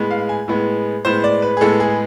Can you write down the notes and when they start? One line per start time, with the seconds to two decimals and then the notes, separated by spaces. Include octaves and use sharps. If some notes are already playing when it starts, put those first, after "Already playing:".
Already playing: A2 G#3 B3
0.11 F5
0.29 G#5
0.48 A2 G#3 B3
1.05 A2 G#3 B3 C5
1.24 D5
1.42 B4
1.57 G#4
1.61 A2 G#3 B3 A4
1.80 G#4